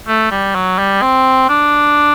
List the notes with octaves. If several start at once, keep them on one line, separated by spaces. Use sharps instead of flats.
A3
G3
F#3
G3
C4
D4